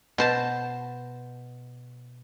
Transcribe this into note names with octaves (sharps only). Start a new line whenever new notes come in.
B2 C5 A5